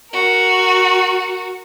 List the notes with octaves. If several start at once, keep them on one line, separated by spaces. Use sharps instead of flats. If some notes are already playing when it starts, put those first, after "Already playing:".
F#4 A#4